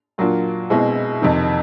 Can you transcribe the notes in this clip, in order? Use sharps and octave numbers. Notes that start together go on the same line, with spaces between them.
A#2 F#3 A#3 D4 F4
B2 G#3 C4 E4
F2 C3 D#3